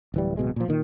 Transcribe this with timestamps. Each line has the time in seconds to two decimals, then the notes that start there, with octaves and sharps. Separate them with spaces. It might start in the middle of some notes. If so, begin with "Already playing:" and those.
0.14 D1 E3 G3
0.37 D1 B2 G#3
0.56 A#2 F3
0.68 A#2 D#3